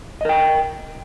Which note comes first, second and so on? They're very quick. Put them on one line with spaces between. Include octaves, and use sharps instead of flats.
D#5 A#4 G5